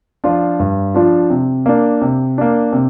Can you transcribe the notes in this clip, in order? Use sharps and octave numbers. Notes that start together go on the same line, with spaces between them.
F3 D4 F4
G2
F3 D4 F4
C3
A#3 D4
C3
A#3 D4
C3